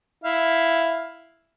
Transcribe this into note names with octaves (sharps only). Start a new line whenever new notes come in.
E4 F5